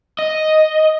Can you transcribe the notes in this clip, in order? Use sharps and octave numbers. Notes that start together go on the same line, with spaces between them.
D#5